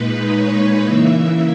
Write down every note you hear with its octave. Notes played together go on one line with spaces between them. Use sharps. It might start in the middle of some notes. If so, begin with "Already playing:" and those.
Already playing: A#2 G#3 D#4 B4
C#5
C#3 E3 A#3 E5